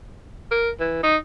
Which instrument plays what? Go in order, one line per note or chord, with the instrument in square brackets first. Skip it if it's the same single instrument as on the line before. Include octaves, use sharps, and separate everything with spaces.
[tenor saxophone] A#4
E3
D#4